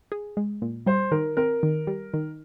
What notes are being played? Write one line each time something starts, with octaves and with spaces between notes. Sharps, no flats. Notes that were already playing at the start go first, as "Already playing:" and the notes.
G#4
G#3
A#2
G3 C5
D#3 A#4
C4 A#4
D#3
G3
D#3